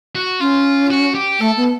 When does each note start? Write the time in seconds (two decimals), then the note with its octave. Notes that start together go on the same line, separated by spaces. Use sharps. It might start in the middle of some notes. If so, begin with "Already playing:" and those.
0.15 F#4
0.40 C#4 F4
0.91 F#4
1.15 G4
1.40 A3 A4
1.57 B3